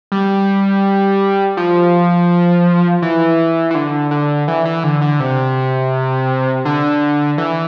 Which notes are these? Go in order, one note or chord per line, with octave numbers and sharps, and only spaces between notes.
G3
F3
E3
E3
D3
D3
E3
E3
D3
D3
C3
D3
E3